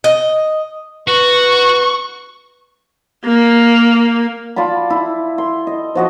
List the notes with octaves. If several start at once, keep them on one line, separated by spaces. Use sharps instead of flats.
D#5
F#4 B4 C#6
A#3
F4 D5 A5 B5
E4
C6
D#5
F3 F#4 D#5